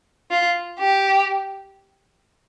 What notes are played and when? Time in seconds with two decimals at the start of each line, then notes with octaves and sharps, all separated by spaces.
0.31 F4
0.79 G4